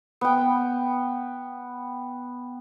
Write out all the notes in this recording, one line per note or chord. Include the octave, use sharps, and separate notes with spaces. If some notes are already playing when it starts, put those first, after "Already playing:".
B3 G5